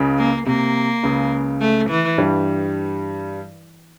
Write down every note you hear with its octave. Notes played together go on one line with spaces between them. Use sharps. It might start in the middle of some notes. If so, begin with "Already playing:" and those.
Already playing: C#2 C#3
A#3
C3 A#3
C#2 C#3
A3
E3
G2 G3